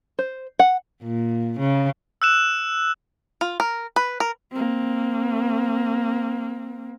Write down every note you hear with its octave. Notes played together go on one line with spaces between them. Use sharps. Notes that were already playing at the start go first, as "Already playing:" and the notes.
C5
F#5
A#2
C#3
E6 F#6 E7
F4
A#4
B4
A#4
A#3 C4